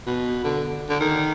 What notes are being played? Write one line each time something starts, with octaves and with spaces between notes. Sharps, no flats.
B2
D3
D3
D#3